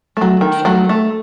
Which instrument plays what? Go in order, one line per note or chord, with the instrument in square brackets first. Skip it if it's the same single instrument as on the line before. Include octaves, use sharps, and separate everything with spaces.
[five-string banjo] F#3 A3
D#3
F#3 A3
A3